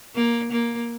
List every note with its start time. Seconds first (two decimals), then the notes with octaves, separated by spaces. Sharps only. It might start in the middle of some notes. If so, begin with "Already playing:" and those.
0.15 A#3
0.52 A#3